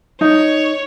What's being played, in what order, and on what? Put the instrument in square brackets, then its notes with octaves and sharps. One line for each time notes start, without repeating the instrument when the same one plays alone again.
[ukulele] D#4 [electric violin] C#5